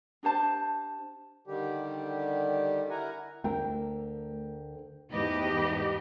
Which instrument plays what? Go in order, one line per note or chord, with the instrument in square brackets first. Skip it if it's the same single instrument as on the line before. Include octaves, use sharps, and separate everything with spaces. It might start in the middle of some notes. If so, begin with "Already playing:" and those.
[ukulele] D4 G4 C5 A5
[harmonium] D3 D#3 G3 G4
E4 A#4 F#5 G#5 A#5
[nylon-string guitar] D2 D3 A#4 [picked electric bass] A3 [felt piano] G5
[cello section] E2 G#2 G4 B4 D#5